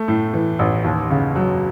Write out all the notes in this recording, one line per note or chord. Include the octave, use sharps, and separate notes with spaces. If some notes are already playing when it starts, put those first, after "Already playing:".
Already playing: A3
A2
E3
A1
D#2
C#3
F#3